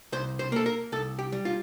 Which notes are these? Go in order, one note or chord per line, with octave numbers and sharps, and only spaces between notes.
C2 C5
C5
A#3 A4
A#4
C2 A4
G4
G3
F4